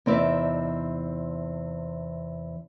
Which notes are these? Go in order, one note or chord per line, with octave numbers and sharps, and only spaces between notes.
E2 C3 C4 D#4 D5 E5